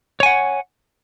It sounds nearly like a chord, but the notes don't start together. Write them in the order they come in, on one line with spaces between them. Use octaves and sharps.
C#5 G#5 F#5